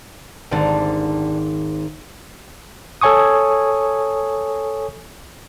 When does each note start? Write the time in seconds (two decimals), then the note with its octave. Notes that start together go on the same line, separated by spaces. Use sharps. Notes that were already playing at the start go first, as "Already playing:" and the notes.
0.51 G#1 D3 G3
3.01 A4 C#5 G#5 C#6 D#6